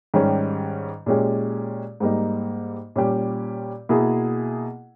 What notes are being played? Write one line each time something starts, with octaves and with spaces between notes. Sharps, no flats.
G#2 D#3 G3 C#4 G4
A#2 G#3 C#4 G4
G#2 G3 A#3 D#4
A#2 G3 C#4 G4
B2 A#3 E4 G#4